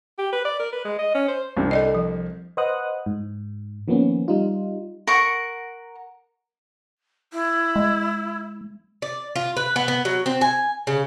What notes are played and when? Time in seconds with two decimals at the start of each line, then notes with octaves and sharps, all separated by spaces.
0.18 G4
0.33 B4
0.45 D5
0.59 A#4
0.72 B4
0.85 G#3
0.99 D#5
1.15 C#4
1.28 C5
1.57 C2 C4 D4
1.71 A4 D5 D#5
1.95 F3
2.57 B4 C5 D#5 F#5 D#6 F#6
3.06 G#2
3.88 D#3 F3 A#3 B3 C#4
4.28 G3 D#4 F4
5.07 A#4 F#5 A#5 C#6
7.33 E4
7.76 G#3
9.02 D5
9.36 F4
9.57 B4
9.76 B3
9.88 B3
10.05 F#3
10.26 C4
10.41 G#5
10.87 C#3